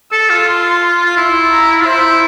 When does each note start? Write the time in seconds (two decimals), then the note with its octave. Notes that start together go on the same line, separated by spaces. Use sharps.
0.12 A4 E6
0.30 F4
0.47 C6
1.05 F4
1.17 E4 C6
1.52 A#5
1.81 F4
1.85 E4 C5